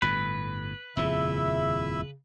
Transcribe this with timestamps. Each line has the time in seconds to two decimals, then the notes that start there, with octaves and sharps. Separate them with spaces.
0.02 G1 A2 B4
0.97 D#1 F2 C#3 F3 E4 E5